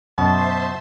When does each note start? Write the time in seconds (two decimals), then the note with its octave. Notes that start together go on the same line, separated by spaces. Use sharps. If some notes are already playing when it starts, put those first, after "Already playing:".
0.18 F#2 B2 C5 E5 A5 C6